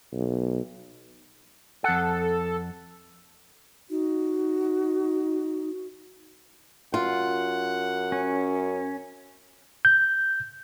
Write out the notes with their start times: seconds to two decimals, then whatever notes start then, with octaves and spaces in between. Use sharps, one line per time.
0.13 B1
1.84 F2 A4 F#5
3.90 D#4 F#4
6.94 F#2 F4 F#5
8.12 C#4
9.85 G6